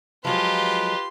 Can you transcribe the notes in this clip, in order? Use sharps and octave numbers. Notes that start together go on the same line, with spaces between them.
F3 F#3 G#3 F4 G4 B4 C6